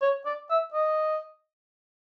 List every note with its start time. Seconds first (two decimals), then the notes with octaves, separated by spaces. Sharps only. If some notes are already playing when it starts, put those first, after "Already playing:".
0.02 C#5
0.26 D5
0.50 E5
0.74 D#5